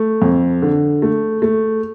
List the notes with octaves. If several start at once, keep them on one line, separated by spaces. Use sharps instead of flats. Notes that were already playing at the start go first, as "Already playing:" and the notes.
Already playing: A3
F2
D3
A3
A3